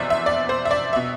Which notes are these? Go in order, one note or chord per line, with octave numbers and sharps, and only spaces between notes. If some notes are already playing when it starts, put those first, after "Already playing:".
Already playing: F1 E2 B2 C5 D5 E5
E5
D5
C5
E5
D5
B2 E5